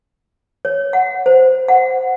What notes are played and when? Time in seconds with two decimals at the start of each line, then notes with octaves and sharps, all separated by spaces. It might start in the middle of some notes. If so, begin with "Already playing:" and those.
0.65 C#5
0.93 F#5
1.26 C5
1.68 F#5